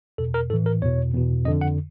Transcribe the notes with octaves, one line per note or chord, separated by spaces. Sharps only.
E2 B2 A4
A#4
A2 E3 A4
A#4
E2 B2 C#5
E2 B2
F2 D3 D#5
F#5